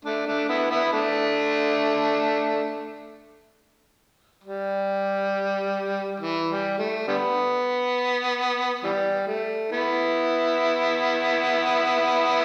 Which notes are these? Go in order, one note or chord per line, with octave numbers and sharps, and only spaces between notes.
A3 D4
A3 D4
B3 E4
B3 E4
A3 D4
G3
E3
G3
A3
D3 G3 B3
E3 G3
A3
B3 E4